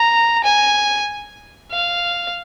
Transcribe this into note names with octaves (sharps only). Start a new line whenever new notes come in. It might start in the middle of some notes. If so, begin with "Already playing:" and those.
Already playing: A#5
G#5
F5